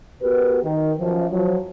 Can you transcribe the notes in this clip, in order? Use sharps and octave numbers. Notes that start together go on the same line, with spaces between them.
B3 F#4 G4 A#4 B4
D#3
F#2 F3
F3 F#3